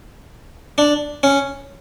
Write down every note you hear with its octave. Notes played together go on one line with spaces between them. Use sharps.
D4
C#4